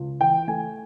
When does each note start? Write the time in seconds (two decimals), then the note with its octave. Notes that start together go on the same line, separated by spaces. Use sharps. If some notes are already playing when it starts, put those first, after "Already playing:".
Already playing: C#2
0.21 E3 G5
0.48 A3 G#5